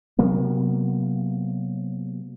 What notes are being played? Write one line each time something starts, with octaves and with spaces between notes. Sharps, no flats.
C3 F#3 A#3 B3